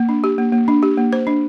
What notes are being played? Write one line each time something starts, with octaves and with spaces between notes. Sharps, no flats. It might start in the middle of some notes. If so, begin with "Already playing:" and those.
Already playing: A#3
D4
G4
A#3
A#3
D4
G4
A#3
C5
D4